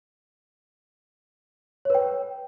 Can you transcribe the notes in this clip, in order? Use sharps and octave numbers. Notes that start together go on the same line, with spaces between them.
B4 C#5 G5